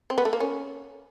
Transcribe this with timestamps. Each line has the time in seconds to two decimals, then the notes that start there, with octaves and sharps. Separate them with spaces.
0.10 C4
0.18 B3
0.25 A3
0.33 A#3
0.40 C#4